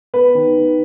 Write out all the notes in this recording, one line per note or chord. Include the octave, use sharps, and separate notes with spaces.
B3 B4
D#3
D#3